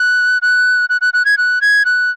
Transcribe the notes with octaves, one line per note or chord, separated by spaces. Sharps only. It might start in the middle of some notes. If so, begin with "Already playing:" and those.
Already playing: F#6
F#6
F#6
F#6
F#6
G#6
F#6
G#6
F#6